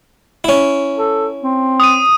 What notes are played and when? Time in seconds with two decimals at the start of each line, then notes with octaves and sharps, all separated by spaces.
0.44 C#4 E4
0.98 A4
1.43 C4
1.80 D#6 D#7